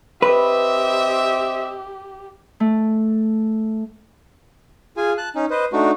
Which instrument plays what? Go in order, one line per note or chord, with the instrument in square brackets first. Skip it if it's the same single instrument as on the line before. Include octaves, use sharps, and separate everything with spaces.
[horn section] C4 D#5 E5 [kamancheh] G4 [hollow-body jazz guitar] B4
[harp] A3
[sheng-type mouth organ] F4 G#4 G#5
A5 F#6
C#4 D#4
B4 C5 D#5
A3 D4 D#4 F#4